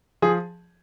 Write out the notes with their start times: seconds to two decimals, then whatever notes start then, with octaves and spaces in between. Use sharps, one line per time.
0.22 F3 G#4